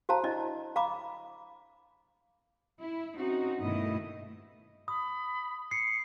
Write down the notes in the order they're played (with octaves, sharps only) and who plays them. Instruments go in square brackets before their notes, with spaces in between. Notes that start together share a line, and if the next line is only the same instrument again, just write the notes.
[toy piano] F#4 C5 F5 A5 A#5
D4 E4 D5 D#5
F5 A#5 B5 D6
[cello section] E4
C4 C#4 D#4 F#4
G2 B2 D#3 A3 E4 D#5
[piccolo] B5 [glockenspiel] D#6
[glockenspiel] C7 [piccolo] C#7